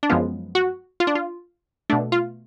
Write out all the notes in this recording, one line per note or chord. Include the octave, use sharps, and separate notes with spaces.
D4
F#2 F3 G#3 B3 F4
F#4
F4
D4
F4
B2 A3 D4
F4